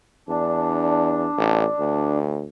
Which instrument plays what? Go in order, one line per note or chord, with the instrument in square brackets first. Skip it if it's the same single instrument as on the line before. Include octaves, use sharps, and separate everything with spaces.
[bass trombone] E2 [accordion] D4
[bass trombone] A1
D2